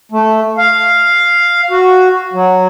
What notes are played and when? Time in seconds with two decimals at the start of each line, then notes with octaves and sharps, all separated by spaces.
0.12 A3
0.58 F5
1.70 F#4
2.33 F#3